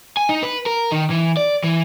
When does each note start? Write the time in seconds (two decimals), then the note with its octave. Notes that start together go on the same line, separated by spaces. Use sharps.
0.17 G#5
0.29 D#4
0.43 B4
0.66 A#4
0.92 D#3
1.10 E3
1.37 D5
1.64 E3